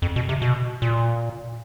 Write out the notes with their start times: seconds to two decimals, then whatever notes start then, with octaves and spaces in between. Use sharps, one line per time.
0.02 F2
0.16 B2
0.29 C3
0.42 B2
0.82 A#2